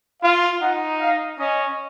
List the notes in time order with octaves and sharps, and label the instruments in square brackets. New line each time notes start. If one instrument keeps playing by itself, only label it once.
[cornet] F4 [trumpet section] F5
[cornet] D#4 [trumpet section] F#5
[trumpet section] F5
[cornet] C#4 [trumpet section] D#5